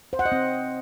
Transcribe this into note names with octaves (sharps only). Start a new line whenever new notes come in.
C5
F#5
D#5
C4